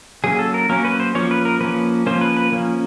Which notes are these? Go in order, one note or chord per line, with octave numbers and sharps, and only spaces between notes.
F#3 A#3 C#4 G#4
A4
A#4
F#3 A#3 C#4 A#4
B4
C5
F3 A#3 C#4 C#5
B4
A#4
F3 A#3 C#4 B4
F3 A#3 C#4 C5
B4
B4
F3 A#3 C#4